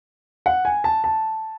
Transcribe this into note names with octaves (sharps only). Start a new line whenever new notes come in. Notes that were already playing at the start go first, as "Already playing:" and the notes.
F#5
G#5
A5
A5